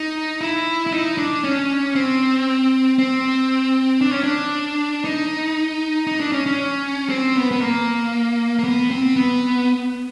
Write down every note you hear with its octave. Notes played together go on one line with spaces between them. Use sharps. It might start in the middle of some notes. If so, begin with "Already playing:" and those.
Already playing: D#4
E4
E4
D#4
D4
C#4
C4
C4
D4
C#4
D4
D#4
D#4
D4
C#4
C#4
C4
B3
B3
A#3
A#3
B3
C4
B3